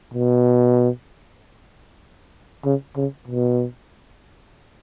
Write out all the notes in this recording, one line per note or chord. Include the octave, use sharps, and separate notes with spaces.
B2
C#3
C#3
B2